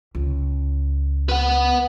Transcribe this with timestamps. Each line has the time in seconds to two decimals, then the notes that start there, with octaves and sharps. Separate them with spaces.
0.15 C#2
1.29 B4 F#5